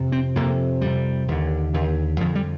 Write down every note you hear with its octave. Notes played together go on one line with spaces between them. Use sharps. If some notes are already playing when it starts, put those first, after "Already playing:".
Already playing: F2 C3
C4
F2 C3 A#3
F2 C3 G3
D#2 D3
D#2 D3
F2 D3 F3
G3